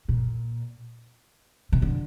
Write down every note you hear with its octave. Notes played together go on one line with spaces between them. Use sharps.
A#2
C3
D3